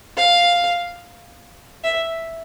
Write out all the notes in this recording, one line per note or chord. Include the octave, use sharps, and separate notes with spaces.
F5
E5